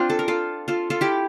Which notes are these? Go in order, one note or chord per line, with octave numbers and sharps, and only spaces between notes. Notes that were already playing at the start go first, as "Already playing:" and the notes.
Already playing: C4 D4 F4
A4
A#4
F4 A4
F4 A4
F4 A4
E4 G4